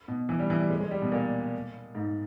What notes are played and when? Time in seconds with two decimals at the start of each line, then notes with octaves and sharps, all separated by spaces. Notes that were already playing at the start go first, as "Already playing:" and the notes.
0.08 B2
0.29 E3
0.39 G3
0.50 E3
0.60 G3
0.70 G#3
0.80 G#3
0.91 G3
1.02 B2
1.12 A#2
1.95 G#2